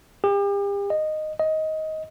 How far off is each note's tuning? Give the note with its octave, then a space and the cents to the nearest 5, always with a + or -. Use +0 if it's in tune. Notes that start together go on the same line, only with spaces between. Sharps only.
G4 +40
D#5 -10
D#5 +15